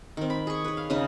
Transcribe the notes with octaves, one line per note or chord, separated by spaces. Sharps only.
D#3 C4
B5
G#4 C#6
B4 C#5
F5
C#3 D#4 B4 D#5